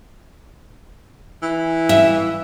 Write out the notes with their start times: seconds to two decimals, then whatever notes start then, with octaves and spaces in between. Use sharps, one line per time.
1.43 E3
1.89 E5